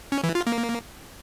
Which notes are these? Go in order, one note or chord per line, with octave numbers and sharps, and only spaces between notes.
C#4
E3
F4
A#3